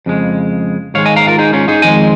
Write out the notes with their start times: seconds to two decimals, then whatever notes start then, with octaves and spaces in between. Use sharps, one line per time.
0.06 F2 C#3 G#3
0.94 G#2 D#3 G#3 C#5 F5
1.05 D#5 G#5
1.16 F5 A#5
1.27 F4 A#4
1.38 D#4 G#4
1.53 C#4 F4
1.68 D#4 G#4
1.82 F2 D#3 G#3 D#5 G#5